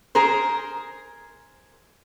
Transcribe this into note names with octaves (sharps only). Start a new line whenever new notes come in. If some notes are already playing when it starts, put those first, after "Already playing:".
G#4 A#4 C5